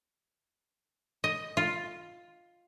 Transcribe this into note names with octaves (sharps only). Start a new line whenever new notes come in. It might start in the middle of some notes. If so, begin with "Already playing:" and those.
D#5
F4